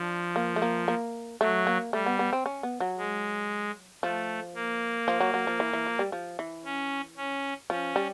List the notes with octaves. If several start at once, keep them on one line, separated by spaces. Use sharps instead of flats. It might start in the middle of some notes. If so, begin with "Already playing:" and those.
Already playing: F3 D4
A#3
A3
A#3
A#3
F#3 A3
A#3
G3 A3
B3
B3
C4
C#4
B3
F#3
G#3
F3 A3
A#3
F3
F#3
F#3
F3
E3
E3
F3
G3
F3
E3
C#4
C#4
F3 C#4
G3